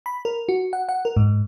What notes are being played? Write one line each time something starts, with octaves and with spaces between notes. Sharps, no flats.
B5
A#4
F#4
F#5
F#5
A#4
G#2